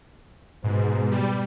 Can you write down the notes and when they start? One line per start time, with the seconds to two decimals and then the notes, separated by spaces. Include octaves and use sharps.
0.64 G#2 B2
1.12 G3